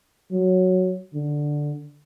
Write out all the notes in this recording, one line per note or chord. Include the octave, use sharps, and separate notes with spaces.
F#3
D3